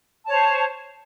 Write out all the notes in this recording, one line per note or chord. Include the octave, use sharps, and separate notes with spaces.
C5 C#5 A5